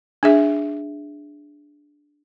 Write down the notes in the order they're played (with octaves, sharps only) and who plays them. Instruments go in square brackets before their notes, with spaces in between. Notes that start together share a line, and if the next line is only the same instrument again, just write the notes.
[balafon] D4 G#4 E5